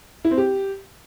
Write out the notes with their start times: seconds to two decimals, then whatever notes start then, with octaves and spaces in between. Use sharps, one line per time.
0.25 E4
0.31 C4
0.37 G4